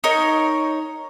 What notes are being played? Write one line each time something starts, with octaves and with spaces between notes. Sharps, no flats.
D#4 A#4 C#5